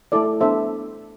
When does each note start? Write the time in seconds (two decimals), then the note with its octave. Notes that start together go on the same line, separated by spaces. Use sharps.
0.12 A3 E4 A4 D5
0.41 B3 D4 A4 C5 E5